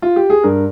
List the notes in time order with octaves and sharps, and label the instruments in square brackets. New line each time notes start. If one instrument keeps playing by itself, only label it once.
[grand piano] F4
G4
G#4
G2 A#4